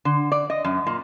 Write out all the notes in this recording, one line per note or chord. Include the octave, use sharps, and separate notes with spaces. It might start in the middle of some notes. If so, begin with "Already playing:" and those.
D3
D5
D#5
F#2
A#2